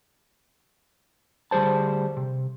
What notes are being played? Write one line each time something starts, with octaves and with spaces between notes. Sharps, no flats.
D2 G3 G#4 C5 A5
C3